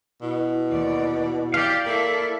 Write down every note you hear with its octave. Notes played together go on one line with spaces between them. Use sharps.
B2 E4
D#2 D5
G4 D5 F5
A#3 E4 A4